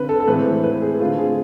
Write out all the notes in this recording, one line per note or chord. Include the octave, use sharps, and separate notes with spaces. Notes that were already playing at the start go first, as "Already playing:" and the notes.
Already playing: D3 C4 B4
A4
A4
A2 E3 G#3 C4 B4
B4
G#4
D3 A3 C4 F4
G#4